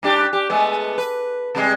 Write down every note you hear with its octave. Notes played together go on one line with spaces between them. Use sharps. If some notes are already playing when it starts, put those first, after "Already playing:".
G#2 D4 G4
G4
G#3 A3 B3
B4
C3 G3 G#3